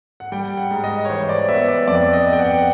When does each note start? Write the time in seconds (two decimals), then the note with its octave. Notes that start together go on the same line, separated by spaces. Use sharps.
0.20 F#5
0.32 G3 G5
0.57 F#5
0.71 G#2
0.84 D#5
1.05 C#5
1.10 E3 C5
1.29 D5
1.48 B3 E5
1.69 D5
1.88 F2 D5
2.13 D#5
2.26 B3
2.33 G5
2.39 F#5
2.58 F#5